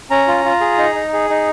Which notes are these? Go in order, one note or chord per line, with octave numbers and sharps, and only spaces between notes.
C#4 A#5
F4
F4
G#4
D#4
D#4
G#4
D#4